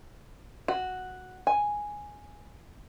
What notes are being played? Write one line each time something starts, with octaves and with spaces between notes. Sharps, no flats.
F#4
G#5